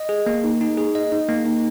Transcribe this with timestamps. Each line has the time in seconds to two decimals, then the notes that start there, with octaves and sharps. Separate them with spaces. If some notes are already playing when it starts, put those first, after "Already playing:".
Already playing: D#5
0.09 G#4
0.26 A#3
0.44 D#4
0.61 D#4
0.77 G#4
0.95 D#5
1.12 D#4
1.29 A#3
1.46 D#4